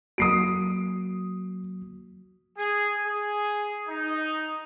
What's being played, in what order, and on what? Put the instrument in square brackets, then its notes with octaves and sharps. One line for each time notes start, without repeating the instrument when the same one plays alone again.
[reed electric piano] F#3 A#3 F#4 [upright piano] D#6 C7 D7
[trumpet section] G#4
G#4
D#4